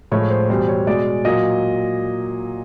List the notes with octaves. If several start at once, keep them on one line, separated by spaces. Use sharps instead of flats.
A2 F3 G#3 C#5
C5
E2 B2 G3 C5
C#5
B2 G#3 D5
A#2 F#3 D#5